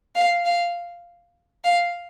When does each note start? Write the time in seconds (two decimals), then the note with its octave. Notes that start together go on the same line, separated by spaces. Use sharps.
0.15 F5
0.45 F5
1.64 F5